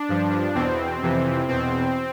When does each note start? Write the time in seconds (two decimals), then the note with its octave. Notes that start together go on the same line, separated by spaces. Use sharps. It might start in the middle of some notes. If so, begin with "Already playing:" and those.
Already playing: D4
0.09 G2 F3
0.55 E2 B2 C4
1.02 F2 C3 E3
1.48 E2 B2 C4